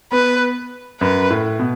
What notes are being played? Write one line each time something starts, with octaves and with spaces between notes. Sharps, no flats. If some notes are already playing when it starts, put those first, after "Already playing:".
B3 B4
F#2 B4
A2
B2